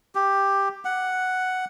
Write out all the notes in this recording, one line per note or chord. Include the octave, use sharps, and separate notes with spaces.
G4
F#5